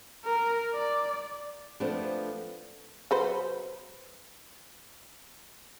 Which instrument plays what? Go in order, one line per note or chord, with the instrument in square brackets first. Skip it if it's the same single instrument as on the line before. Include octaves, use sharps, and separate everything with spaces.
[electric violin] A#4
D5
[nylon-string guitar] F3 A3 B3 C4 D4
[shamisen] F#3 B4 C5